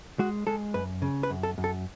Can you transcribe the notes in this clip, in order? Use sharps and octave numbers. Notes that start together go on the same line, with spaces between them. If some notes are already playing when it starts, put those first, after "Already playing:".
G#3 F#4
G#3 A4
F#2 B4
C#3
B4
F#2
A4
F#2
A4